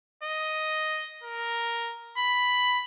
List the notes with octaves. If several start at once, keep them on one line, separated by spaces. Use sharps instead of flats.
D#5
A#4
B5